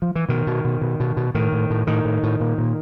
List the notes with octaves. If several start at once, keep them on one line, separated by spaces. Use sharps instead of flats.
F3
E3
B2 D#3
B2
B2
B2
B2
B2
A2 D#3
A2
A2
A2 D#3
A2
A2
A#2
A#2